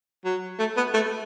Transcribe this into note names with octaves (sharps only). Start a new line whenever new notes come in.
F#3
A3
B3
A3